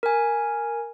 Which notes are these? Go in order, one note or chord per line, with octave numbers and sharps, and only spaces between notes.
A#4 G#5